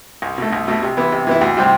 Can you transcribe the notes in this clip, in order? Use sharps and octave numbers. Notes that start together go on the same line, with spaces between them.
C2
B2 A3
C2
B2 A3
C3
E3 B3 E4
C3
E3 B3 E4
D2
C3 G3 C4